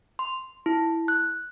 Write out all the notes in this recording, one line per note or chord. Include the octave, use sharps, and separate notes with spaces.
C6
E4
F#6